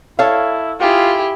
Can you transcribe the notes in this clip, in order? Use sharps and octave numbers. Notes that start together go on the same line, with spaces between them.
E4 A4 C#5 F5
E4 F4 G4 G#4